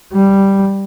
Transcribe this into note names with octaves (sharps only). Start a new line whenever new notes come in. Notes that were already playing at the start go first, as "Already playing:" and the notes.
G3